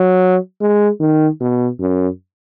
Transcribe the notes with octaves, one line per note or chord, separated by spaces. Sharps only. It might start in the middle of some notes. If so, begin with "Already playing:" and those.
Already playing: F#3
G#3
D#3
B2
F#2